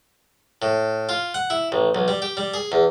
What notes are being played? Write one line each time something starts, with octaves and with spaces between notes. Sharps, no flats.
A2
F4
F#5
E4
A1
B1
G3
G4
G3
G#4
E2